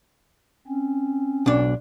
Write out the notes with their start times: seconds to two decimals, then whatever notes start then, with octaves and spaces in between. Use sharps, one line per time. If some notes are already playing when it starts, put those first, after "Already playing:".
0.68 C4 C#4
1.46 B1 D4